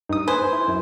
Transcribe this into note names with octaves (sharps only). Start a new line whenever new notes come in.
G2 D#4 D#6
B4 C5 G#5
E4
F#2